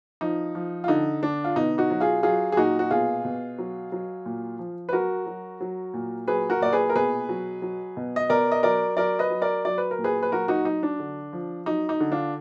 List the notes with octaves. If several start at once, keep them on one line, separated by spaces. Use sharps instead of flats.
F3 D#4
F3
F4
D3 D#4
D3 D4
F4
B2 D#4
D#4 F#4
F#3
F4 G#4
F#3 F4 G#4
G#4
A#2 D#4 F#4
F#4
B2 F4 G#4
B2
F#3
F#3
A#2
F3
B4
F#3 F#4 A#4
F#3
F#3
A#2
F#3 G#4 B4
F#4 A#4
A#2 D5
G#4 B4
A#4
B2 G#4 B4
F#3
F#3
B2
D#5
B2 A#4 D5
D#5
F#3 A#4 D5
F#3 A#4 D5
B4 D#5
F#3
A#4 D5
F#3 D5
B4
A#4
A#2
G#4 B4
B4
F#3 F#4 A#4
D#4 F#4
F#3 D#4
D4
D3
F3
F#3 D#4
D#4
D3
D4 F4